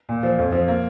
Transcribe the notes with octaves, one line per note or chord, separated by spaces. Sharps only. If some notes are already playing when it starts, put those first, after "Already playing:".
A#2
F3
F2
F3
A#3